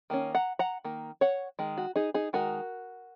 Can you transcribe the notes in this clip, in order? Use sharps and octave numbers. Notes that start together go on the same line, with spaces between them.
D#3 A#3 C#4
F#5 A#5
F#5 A#5
D#3 A#3
C#5 F#5
D#3 G#3
F#4
D#4 G#4
D#4 G#4
D#3 G#3 D#4 F#4 A#4